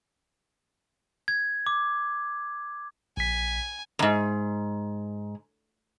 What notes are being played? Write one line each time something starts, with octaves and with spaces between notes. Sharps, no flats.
G#6
D6
A#1 G#5 B6
E2 G#2